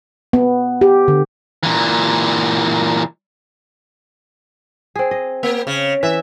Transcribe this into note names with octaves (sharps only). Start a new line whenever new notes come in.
B3
G4
D3
A#2 E3
C4 G#4
D#5
A#3
C#3
E3 E5